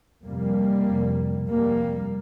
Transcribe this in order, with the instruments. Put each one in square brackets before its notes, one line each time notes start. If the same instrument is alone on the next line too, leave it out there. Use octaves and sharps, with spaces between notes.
[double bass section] F2 C3 G3 A#3
F2 C3
F2 C3 G3 A#3